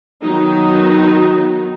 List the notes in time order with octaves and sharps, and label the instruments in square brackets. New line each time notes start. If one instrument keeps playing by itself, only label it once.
[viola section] D#3 F#3 B3 D#4